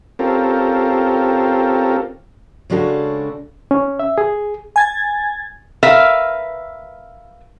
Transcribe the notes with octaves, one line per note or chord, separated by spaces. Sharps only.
C4 C#4 F4 G4 A4 A#4
C#3 G#3 C#4 D4 F#4 A4
C#4
E5
G#4
G#5 G#6 A6
A#4 B4 E5 F5